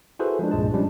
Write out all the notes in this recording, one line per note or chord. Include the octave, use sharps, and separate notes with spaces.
E4 F#4 G#4 A4 B4 C5
F3 G#3 D4
C2 G2 A#2 G#3 A5
F3 G3 G#3 C#4 D4